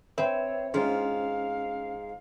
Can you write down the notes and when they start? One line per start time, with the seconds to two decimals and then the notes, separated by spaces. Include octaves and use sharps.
0.18 C4 B4 C#5 E5
0.74 G#2 C#4 F4 F5